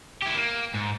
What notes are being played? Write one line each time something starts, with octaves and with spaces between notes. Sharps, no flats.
E4 G4
A#3
G#2